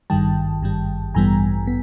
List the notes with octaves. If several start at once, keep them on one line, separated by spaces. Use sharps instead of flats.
G#1 G2 D#3 G3 G5 A5
G#1 G2 D#3 G3
A1 G2 E3 G3 B3 G#5 A#5
B3